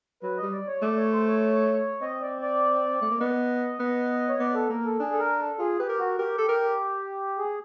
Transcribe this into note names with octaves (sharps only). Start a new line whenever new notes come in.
F#3 B4
G3 D#5
D5
C#5
A3 D5
C#5
C5
C#5
C4 D#5
D5
D5
A3
A#3
B3 D#5
B3
C#5
B3 D5
A4
A#3 A#4
A4
D4 G#4
A4
A#4
A4
F4 G#4
G4 B4
A#4
F#4
G4 A#4
A4
A#4
G#4